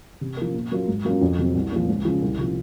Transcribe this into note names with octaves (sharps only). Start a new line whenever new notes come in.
C3
F3 A#3
A#2
F#3 A#3 F4
G#2
F#3 A#3 C#4 F4
F2
C3 F#3 C4
C2
A#2 F3
C#2
C#3 F3
C2
C3 F3